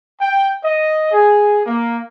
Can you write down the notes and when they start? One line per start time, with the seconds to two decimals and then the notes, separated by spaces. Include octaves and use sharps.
0.19 G5
0.65 D#5
1.12 G#4
1.66 A#3